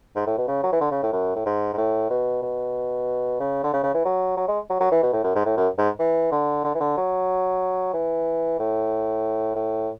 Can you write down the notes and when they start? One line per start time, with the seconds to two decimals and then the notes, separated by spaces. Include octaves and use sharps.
0.16 G#2
0.27 A2
0.38 B2
0.48 C#3
0.64 F#3
0.73 E3
0.81 D3
0.91 C#3
1.03 A2
1.13 F#2
1.36 A2
1.46 G#2
1.73 G#2
1.78 A2
2.10 B2
2.43 B2
3.40 C#3
3.63 D3
3.73 C#3
3.84 C#3
3.94 E3
4.05 F#3
4.37 F#3
4.48 G#3
4.70 F#3
4.80 F#3
4.92 E3
5.03 B2
5.13 A2
5.24 F#2
5.35 G#2
5.45 A2
5.57 F#2
5.78 G#2
5.99 E3
6.32 D3
6.64 D3
6.75 E3
6.80 D3
6.98 F#3
7.94 E3
8.59 A2
9.56 A2